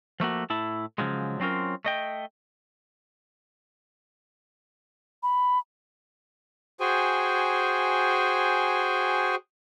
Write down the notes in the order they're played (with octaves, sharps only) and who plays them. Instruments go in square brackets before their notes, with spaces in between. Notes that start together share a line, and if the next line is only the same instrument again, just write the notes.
[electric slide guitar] F3 A3 A#3 F#4
A2 E4 A5
C#3 F3 F#3 G#3
F#3 C4 C#4 F4 A#4
A3 D#5 G5
[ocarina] B5
[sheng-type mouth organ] F#4 G#4 C5 G5 G#5